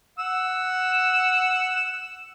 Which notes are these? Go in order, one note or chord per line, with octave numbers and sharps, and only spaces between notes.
F#5 E6